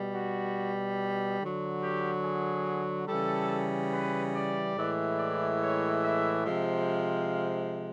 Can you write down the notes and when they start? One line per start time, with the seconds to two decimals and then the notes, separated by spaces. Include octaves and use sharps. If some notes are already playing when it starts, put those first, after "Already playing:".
Already playing: B2 G3
0.14 F#4
1.40 D3 F#3
1.83 G4
2.24 G#4
3.08 C#3 E3 G3 A4
3.93 B4
4.35 D5
4.77 A2 E3 G#3
5.19 D5
5.61 C#5
6.03 E5
6.46 C3 F3 G#3
6.88 F5